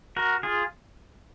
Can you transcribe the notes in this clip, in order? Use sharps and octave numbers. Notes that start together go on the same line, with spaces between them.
F#4 A#4
F4 G#4